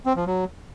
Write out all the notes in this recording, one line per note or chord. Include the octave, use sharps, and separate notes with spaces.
C4
F3
F#3